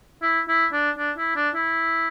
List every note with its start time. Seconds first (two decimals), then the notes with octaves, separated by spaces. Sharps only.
0.22 E4
0.48 E4
0.73 D4
0.98 D4
1.17 E4
1.36 D4
1.55 E4